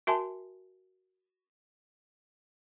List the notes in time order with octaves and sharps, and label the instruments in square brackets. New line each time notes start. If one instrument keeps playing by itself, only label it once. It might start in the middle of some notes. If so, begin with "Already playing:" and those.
[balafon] F#4 A#4 E5 G#5 A5 C6